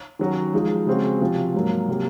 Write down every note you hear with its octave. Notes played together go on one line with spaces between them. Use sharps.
D#3 F#3 C#4 F#4
F3 G#3 D#4 G#4
C#3 G#3 C4 F#4
C3 F3 C4 F#4
G#2 F#3 A#3
C3 F#3 A#3